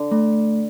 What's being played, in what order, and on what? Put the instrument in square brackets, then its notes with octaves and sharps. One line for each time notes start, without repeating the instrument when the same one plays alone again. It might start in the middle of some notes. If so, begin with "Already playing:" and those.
Already playing: [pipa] D3
[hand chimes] A3